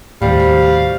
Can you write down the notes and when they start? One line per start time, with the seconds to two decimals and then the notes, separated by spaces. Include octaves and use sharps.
0.22 D#2 A2 C3 G3 F5
0.40 F#4